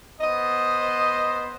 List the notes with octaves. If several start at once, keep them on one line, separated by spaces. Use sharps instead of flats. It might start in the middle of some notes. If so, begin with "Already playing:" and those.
B3 C5 D#5